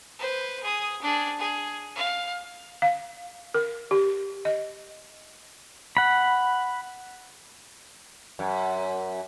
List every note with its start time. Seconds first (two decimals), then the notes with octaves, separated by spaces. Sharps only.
0.19 B4 C5
0.63 G#4 D#6
1.02 D4 G#4
1.39 G#4
1.96 F5
2.82 F5
3.54 A#4
3.91 G4
4.45 D#5
5.97 F#5 B5
8.39 F#2